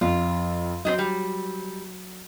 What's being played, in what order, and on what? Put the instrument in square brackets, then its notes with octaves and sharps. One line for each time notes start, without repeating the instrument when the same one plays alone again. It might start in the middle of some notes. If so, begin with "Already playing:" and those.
[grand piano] F2 [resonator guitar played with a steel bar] F4
[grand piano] F#3 [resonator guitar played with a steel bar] C4 D4 D#5
[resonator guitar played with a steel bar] G3